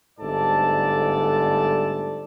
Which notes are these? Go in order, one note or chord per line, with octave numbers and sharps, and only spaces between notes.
G1 G#2 A3 A4 D5 A5